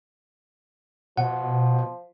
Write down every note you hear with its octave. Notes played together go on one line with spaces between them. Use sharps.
B2 F3 F#5